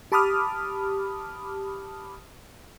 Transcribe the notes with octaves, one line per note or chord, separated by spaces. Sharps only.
G4 A5 B5 D6 D#6 F6